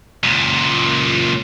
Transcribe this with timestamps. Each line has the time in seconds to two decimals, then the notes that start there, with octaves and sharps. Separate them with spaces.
0.23 C#2 A#2